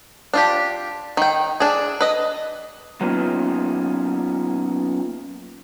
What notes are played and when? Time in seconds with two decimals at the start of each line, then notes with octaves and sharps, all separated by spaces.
0.34 D4 F4 G4
1.17 D#3 G5
1.60 D4 E4 G#4
2.01 B4 D#5
3.01 F#3 A#3 B3 C#4 D#4 F4